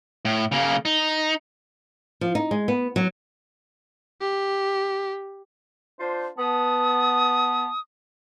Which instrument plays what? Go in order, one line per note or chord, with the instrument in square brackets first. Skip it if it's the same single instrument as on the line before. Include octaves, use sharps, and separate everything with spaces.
[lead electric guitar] A2
C#3 A#3
D#4
[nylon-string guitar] F3
D#4
G#3
B3
F#3
[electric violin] G4
[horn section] D4 F4 C5
[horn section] B3 A5 [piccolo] D#6